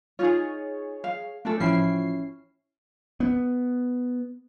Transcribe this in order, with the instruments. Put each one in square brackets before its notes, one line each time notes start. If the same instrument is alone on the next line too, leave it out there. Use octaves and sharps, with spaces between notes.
[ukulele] D#4 F4 [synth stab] G#4 C#5
[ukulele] F5
[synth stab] A3 [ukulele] D4 G#4 A4
[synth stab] A1 F3 C7 [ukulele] C#4 E4 G5
[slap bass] B3